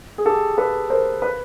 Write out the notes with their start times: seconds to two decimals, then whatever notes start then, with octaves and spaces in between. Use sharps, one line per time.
0.18 G#4
0.25 G4 A4
0.57 A4 B4
0.90 A#4 C5
1.22 B4